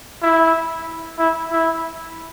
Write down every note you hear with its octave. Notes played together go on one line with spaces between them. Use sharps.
E4
E4
E4